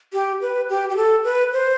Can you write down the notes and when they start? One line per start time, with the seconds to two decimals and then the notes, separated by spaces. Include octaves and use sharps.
0.13 G4
0.41 B4
0.69 G4
0.89 G4
0.96 A4
1.24 B4
1.53 C5